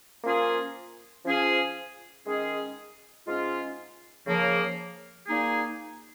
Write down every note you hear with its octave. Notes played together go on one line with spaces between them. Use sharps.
F3 A#3 C#4 F4 G#4
F3 C#4 G#4
D#3 G#3 C#4 G#4
G#2 G#3 C#4 F4
C#3 F3 A#3
A#2 A#3 D#4 G#4